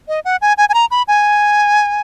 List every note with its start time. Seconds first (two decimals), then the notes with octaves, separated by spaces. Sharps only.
0.08 D#5
0.25 F#5
0.42 G#5
0.58 G#5
0.69 G#5
0.74 A#5
0.91 B5
1.08 G#5